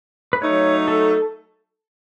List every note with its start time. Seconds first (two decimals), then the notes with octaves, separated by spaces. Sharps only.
0.33 B4
0.41 F#3 A3 D#4 C#5
0.88 A4